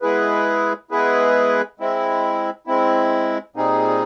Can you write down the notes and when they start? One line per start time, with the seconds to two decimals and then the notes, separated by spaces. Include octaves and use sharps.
0.02 G#3 B3 E4 G#4 B4
0.91 G#3 B3 E4 G#4 B4
1.80 G#3 C4 E4
2.67 G#3 C4 E4
3.56 A#2 G3 C4 D#4 G#4